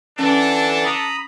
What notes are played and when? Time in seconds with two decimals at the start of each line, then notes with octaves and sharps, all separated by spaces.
0.19 D3 E3 C#4 D4 A4
0.85 A#5 B5 D#6